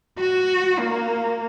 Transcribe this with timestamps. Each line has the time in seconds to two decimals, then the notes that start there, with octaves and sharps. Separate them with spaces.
0.18 F#4
0.79 A#3